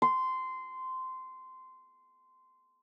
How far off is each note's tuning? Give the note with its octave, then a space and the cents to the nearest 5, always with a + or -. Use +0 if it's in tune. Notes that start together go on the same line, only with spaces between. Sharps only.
C6 -15